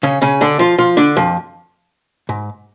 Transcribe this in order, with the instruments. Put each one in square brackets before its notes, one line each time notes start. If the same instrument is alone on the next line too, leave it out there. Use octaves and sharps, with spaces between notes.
[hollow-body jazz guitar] C#3 C#4
C#3 C#4
D3 D4
F3 F4
F3 F4
D3 D4
F2 F3
G#2